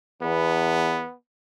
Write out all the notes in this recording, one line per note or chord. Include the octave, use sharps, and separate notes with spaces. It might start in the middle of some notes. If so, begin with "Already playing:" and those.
E2 B3